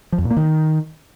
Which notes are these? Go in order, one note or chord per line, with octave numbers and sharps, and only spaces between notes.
F3
F2
A#2
A#3
D#3